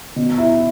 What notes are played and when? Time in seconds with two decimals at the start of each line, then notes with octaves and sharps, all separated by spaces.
0.16 B2
0.38 E4